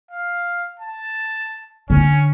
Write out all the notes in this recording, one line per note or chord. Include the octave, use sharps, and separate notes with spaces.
F5
A5
D3 C#4